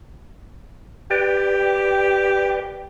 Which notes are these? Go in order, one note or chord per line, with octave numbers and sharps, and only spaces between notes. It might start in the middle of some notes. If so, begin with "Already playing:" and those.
G4 B4 D5 G5